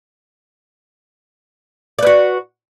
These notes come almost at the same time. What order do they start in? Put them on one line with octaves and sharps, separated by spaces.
D5 B4 F#4